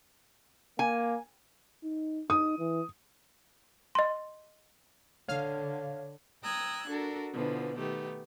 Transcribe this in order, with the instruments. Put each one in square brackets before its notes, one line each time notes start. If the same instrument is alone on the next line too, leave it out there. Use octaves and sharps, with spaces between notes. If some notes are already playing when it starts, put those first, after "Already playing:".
[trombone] A#3 [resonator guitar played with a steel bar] G#5
[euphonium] D#4
[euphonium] D#4 [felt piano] D#6
[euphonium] E3
[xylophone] D#5 C6
[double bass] D3 [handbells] C#5 [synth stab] F5
[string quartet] G5 A#5 D#6 E6 F#6 G#6
D4 F#4 A4 A#4
B2 D3 E3 F3 B3
D#3 A3 B3 G4